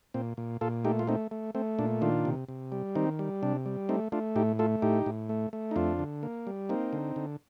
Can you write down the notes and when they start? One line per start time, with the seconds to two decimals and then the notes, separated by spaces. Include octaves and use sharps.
0.14 A#2 C4
0.37 A#2
0.61 A#2 F4 A4
0.85 A3 D#4 G4
0.99 F4
1.07 A3 C4 D#4
1.31 A3
1.55 A3 C4
1.78 A#2 D4
2.01 D#3 D4 F4
2.25 C3
2.49 C3
2.72 G3
2.95 D#3 C4 D#4
3.19 G3
3.43 C3 D4
3.66 G3
3.89 A3 C4 D#4
4.12 A3 D4 F4
4.36 A2 D#4 G4
4.59 A3 F4 A4
4.82 A2 D#4 G4
5.06 A2
5.29 A3
5.53 A3
5.71 D#4
5.76 F2 D4 F4
5.99 D3
6.23 A#3
6.47 G3
6.69 A#3 C4 D#4
6.93 D3
7.16 D3